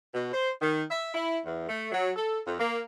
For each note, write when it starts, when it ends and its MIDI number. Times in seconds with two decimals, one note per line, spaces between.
0.13 0.33 47
0.33 0.49 72
0.60 0.82 51
0.90 1.10 76
1.14 1.38 64
1.44 1.66 40
1.68 1.87 57
1.92 2.10 54
2.15 2.39 69
2.46 2.56 41
2.59 2.81 58